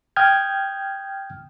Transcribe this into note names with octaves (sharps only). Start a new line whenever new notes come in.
G5 D#6 F6 G6 G#6